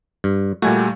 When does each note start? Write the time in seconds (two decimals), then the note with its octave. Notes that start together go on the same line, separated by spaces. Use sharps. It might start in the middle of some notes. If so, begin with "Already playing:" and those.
0.24 G2
0.62 A#2 G3 A3 F#4 G#5